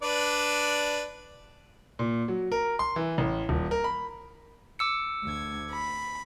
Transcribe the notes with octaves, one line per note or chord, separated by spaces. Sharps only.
D4 B4 D5
A#2
F#3
A#4
C6
E3
A1
D#1
A#4
B5
D6 E6 C#7
D2 G#6
B5